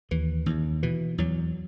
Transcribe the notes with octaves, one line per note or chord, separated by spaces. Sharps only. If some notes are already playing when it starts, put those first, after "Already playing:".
D#2 E3
D#2
B2 E3
E2 F#3